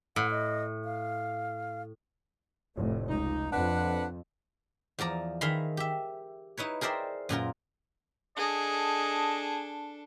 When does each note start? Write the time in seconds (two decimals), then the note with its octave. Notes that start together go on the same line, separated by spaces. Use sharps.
0.16 A2 F#5
0.31 D#5
0.85 F5
2.76 F1 A2
3.08 C#2 D#4
3.53 F2 D4 B4 F#5
4.99 E2 F3 D5 A#5
5.41 D#3 G#4 E5 F5 B5 C6
5.77 G4 E5
6.57 D#4 E4 B4 C#5
6.81 G#4 A#4 C5 D5 E5 G5
7.29 F#2 A#2 F4 A#4
8.37 D4 G#4 A4 D#5